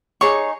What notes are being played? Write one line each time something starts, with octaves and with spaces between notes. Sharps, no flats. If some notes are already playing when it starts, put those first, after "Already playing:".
D#4 G#4 C#5 C#6